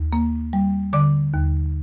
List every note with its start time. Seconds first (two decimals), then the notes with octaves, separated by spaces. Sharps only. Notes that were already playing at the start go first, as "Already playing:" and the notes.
Already playing: D#2
0.13 A#3
0.53 G3
0.93 D3 D5 D6
1.34 D#2